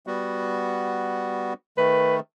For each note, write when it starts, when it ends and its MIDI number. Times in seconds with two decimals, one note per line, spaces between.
0.07 1.54 55
0.07 1.54 59
0.07 1.54 66
1.78 2.20 51
1.78 2.20 57
1.78 2.16 71